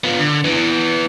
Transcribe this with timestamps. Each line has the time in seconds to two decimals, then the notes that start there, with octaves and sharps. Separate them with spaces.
0.04 B3 F4
0.20 D3
0.45 E3 B3